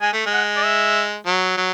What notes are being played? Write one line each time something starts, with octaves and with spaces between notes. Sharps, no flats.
G#3 G#5
A3
G#3
F#5
D5
E5
F#3
F#3